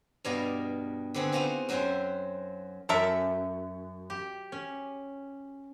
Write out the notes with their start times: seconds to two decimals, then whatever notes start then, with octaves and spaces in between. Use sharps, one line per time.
0.25 G2 B2 B3 D5 D#5 F5
1.14 D3 B3 C4 G#4 B4
1.32 B3 D#4 F4 F#4 C5
1.69 F#2 F#3 C5 E5 G5
2.89 F#2 A4 A#4 E5
4.10 G4
4.52 C#4